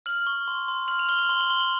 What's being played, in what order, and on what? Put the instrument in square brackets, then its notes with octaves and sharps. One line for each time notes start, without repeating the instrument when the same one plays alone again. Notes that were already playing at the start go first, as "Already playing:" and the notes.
[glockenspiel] F6 F#7
C#6
C6
C6
F6 F#7
F7
F6 G7
F#7
C6 G7
F#7
C6 G7
F#7